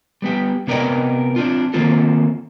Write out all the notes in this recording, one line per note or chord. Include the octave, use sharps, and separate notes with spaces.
G3 B3 G4
C3 B3 A#4 D5 D#5 G5
C4 D4 F4
D#3 A#3 C4 F4 A4